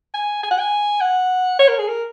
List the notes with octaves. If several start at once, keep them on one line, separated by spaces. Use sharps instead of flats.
G#5
G#5
F#5
G#5
F#5
C#5
A#4
G#4
A#4